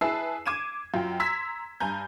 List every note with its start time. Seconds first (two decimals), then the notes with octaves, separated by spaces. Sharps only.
0.01 E4 G#4 B4 A5 E6 C7
0.46 D6 G#6 D#7 E7
0.94 F#2 F4 G5
1.20 A#5 C6 E6 G#6 B6
1.80 G2 G#5 A#5 G6